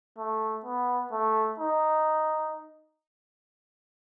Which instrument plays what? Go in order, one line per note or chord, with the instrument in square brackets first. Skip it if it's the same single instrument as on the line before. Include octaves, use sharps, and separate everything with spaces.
[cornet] A3
B3
A3
D#4